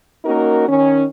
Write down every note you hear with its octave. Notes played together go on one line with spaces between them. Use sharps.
A#3 C#4 D#4 F#4 A#4
D#3 C#4